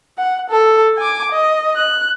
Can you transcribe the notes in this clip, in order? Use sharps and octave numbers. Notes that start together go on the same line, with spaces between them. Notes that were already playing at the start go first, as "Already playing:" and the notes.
F#5
A4
G#5 D6
D#5
F#6